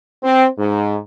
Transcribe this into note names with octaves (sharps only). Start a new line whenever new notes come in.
C4
G#2